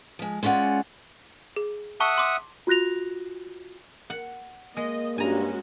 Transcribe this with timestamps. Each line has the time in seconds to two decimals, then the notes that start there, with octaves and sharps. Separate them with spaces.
0.19 F3 G#3
0.43 G#3 C#4 F4 D5 F#5
1.56 G#4
2.00 E5 F#5 A5 C#6 D#6
2.18 C6 D6
2.67 F4 F#4 F#6 A#6 F7
4.10 F#5
4.77 G#3 A#3 D#5
5.18 G2 G#3 C#4 F#4 G#5 A#5